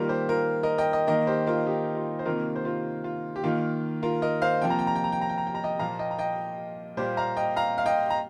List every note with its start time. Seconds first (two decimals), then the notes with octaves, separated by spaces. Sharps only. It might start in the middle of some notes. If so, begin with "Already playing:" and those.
Already playing: D#3 G3 A#3 F4 A#4
0.09 G4 C5
0.29 F4 A#4
0.63 A#4 D#5
0.78 D#5 G5
0.93 D#5 G5
1.07 D#3 A#3 A#4 D#5
1.27 G4 C5
1.47 F4 A#4
1.66 D#4 G4
1.96 F4
2.19 C5
2.25 C3 D#3 A#3 F4 A#4
2.56 C5
2.65 F4 A#4
3.04 F4
3.36 G4
3.44 D#3 A#3 F4
4.03 F4 A#4
4.22 A#4 D#5
4.42 C5 F5
4.61 C3 F3 A#3 G5
4.70 A#5
4.79 G5
4.87 A#5
4.96 G5
5.04 A#5
5.12 G5
5.21 A#5
5.30 G5
5.38 A#5
5.47 G5
5.55 A#5
5.63 D#5 G5
5.79 A#2 F3 A#3 F5 A#5
5.99 D#5 G5
6.11 A#5
6.19 D#5 G5
6.97 A#2 G3 A#3 G4 C5
7.17 F5 A#5
7.37 D#5 G5
7.56 F5 A#5
7.78 F5
7.86 D#5 G5
8.10 A#5